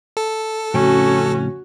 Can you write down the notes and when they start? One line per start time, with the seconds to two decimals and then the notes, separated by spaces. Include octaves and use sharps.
0.17 A4
0.74 F2 A2 C#3 C#4 F#4